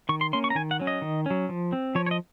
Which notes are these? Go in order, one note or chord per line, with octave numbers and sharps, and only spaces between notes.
D#3 C#6
C6
A#3 C#4 C6
C#6
A#5
D#3 G#5
F#5
F#3 C#4
D#5
D#3
F#3 C#4
F3
C4
F3 C#5
C#5
D#5